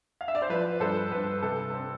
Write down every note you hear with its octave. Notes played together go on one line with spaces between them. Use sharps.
F5
E5
D5
C5
F3 B4
G2 A4 C5
G2 B4
C3 A4
C4